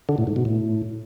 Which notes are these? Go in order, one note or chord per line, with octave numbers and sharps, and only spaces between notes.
D3
A2
G#2
B2
A2